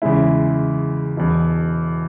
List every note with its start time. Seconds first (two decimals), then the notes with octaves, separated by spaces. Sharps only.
0.02 E2 C#3 G#3 E4
1.17 E1 E2 B2